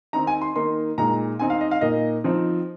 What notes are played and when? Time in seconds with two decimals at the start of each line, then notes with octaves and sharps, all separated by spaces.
0.13 D#3 C4 D#4 A#5
0.27 G#5
0.42 C6
0.56 D#3 A#3 D#4 C6
0.98 A#2 G#3 D#4 A#5
1.39 D#3 C4 D#4 G#5
1.50 F5
1.61 D#5
1.71 F5
1.81 A#2 A#3 D#4 D#5
2.24 F3 C4 D#4